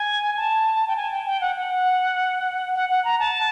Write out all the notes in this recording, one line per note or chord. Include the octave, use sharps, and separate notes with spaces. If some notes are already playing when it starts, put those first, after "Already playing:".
Already playing: G#5
A5
G5
G#5
G5
G5
F#5
F#5
F#5
F#5
A#5
A5